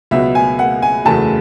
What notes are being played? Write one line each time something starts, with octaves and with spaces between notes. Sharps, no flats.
C#2 B2 F#3 B3 E5
G#5
F#5
G#5
F#1 E2 C#3 F#3 A3 A5